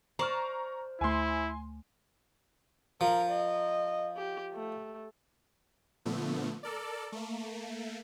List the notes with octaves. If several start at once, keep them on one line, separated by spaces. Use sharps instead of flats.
C5 D5 A5 A#5 C#6 F6
D2 A3 E4 G#5 C6
F3 A#4
D#5
G4
A3
A#2 D3 F3 A3 B3
A4 A#4 D5
A3 A#3